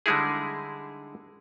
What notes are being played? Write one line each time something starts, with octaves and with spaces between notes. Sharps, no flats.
D3 G3 G#3 D#4 E4 G#4